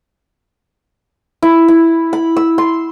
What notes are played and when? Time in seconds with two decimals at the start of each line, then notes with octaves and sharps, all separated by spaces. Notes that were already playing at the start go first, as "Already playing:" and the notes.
1.42 E4
1.68 E4
2.13 B5
2.36 E6
2.58 C6